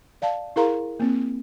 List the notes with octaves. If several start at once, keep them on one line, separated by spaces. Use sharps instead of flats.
D5 F5 A5
E4 G#4 A#4 F5 A#5 C6
A#3 C4